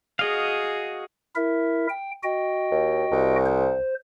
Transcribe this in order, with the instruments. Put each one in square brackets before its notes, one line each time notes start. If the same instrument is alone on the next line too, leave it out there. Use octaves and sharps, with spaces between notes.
[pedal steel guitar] F#4 D#5 F5 [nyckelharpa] G#4
[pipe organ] E4 A#4 E5
G5
F#4 D#5 G5
[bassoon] D#2
C2
[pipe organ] C5